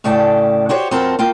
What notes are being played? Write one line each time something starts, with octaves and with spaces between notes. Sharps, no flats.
A2 C#3 A3 D5 G5 A5
F#4 G4 C5 C#5
F2 C4 F#4 A#4 C5 A5
A#3 F4 G5